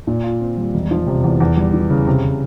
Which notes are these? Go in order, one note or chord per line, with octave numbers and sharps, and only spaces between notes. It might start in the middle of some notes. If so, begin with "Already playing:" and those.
A#2
F4
C4
G3
E1
F3
C3
E2
E2
G3
E3
C#3
C3
C3